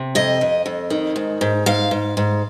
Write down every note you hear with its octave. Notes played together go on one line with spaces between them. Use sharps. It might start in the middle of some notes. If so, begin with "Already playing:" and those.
Already playing: C3
F2 D#5
F2
F2
D#3
G#2
G#2
G#2 F5
G#2
G#2